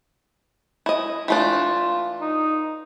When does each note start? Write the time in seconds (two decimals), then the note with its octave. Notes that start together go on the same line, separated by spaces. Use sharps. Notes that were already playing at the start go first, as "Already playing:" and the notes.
0.86 E4 D#5
1.28 E3 A3 D4 F4
2.21 D#4